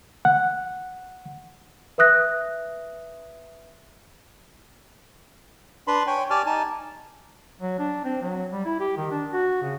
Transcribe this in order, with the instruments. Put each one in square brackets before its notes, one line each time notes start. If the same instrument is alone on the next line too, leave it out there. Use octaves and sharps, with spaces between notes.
[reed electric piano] F#5
[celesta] B4 E5 D#6 F#6 A#6
[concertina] D4 B4 B5 C6
C#5 G5 G#5
G4 D5 G#5 A5 F6
D#4 G#5 A5
[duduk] F#3
D4
C4
F#3
G3
E4
G4
D#3
D4
F#4
C#3